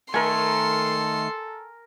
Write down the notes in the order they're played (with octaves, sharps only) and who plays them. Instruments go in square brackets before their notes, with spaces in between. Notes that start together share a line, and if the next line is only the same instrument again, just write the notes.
[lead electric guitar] D#3 A3 [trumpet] A4 [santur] A#4 G#5 [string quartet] C6